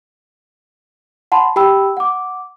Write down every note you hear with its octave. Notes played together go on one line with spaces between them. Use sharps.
F#5 A5 B5 C6
G4 G5 B5 E6
F#5 D6